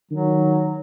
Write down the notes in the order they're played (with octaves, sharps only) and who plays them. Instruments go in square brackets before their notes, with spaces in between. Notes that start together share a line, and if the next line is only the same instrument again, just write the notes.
[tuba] D#3 [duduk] F#3